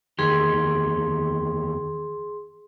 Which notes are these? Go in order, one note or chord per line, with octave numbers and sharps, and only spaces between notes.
E2 D#3 G4 G#4 C6